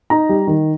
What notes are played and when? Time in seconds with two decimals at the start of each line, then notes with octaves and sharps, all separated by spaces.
0.10 D#4 A#5
0.29 G3
0.47 D#3